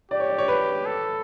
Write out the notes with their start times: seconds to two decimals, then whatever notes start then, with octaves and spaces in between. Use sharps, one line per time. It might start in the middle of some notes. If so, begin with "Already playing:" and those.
0.11 G4 D5
0.20 C#5
0.29 D5
0.38 C#5
0.48 B4
0.86 A4